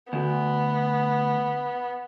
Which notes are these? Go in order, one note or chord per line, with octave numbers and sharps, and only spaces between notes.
D2 B3